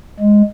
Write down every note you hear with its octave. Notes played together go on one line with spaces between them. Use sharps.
G#3